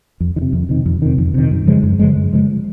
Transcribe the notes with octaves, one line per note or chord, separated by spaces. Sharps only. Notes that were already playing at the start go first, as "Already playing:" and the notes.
F2
D#3
C3
F2
C3 D#3
F2
C3 D#3
F2
C3 D#3
F#2
C#3 F3 G#3
F#2
C#3 F3 G#3
F#2
C#3 F3 G#3